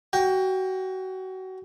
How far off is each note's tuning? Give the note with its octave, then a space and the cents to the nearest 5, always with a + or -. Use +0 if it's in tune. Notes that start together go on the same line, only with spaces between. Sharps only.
F#4 +25 G5 +15